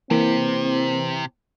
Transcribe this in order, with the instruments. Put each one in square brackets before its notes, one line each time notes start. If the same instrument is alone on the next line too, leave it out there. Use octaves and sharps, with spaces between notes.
[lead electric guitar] C3 [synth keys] E3 [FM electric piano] A#3 [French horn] C4